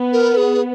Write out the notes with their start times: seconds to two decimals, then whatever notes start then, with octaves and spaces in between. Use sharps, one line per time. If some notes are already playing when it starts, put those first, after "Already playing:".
Already playing: B3
0.13 A#4
0.37 G#4